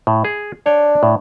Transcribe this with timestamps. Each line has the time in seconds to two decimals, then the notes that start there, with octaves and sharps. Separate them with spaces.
0.07 A2
0.25 G#4
0.66 D4 C#5 G5
1.03 A2